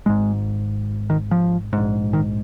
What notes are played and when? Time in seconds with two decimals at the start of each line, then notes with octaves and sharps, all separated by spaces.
0.06 G#1 G#2 G#3
1.10 D#3
1.31 F3
1.73 A#1 G#2
2.13 D#3